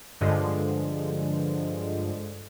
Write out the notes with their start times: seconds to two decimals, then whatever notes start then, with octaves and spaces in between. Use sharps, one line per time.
0.21 G2 D3 F3 G#3